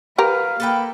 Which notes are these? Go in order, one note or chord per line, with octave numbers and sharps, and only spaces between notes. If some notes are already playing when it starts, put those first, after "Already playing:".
G4 A#4 B4 F5
A#3 A4 B4 G5